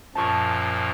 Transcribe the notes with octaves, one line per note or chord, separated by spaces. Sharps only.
F#2 A#2 F3 A5 C#6